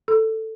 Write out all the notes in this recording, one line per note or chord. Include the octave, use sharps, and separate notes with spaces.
A4